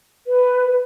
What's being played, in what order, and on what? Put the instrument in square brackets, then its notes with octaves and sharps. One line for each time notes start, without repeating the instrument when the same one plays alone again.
[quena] B4